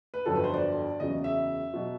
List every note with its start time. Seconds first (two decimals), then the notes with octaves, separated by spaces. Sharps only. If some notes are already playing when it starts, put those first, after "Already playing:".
0.14 B4
0.25 G1 F2 D3 F#3 A4
0.35 B4
0.44 C5
0.54 D5
1.00 F#1 E2 C#3 F#3 D#5
1.24 E5
1.74 B2 F#3